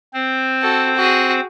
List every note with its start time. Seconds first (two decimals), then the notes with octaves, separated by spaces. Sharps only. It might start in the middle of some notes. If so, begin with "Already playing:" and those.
0.14 C4 C5
0.61 F#4 A4
0.96 F#4 G#4